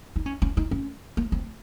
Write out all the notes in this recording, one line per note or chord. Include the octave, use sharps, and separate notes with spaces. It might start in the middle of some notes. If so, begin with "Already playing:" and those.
D#4
C#4
C#4
D#4
C#4
A#3
C4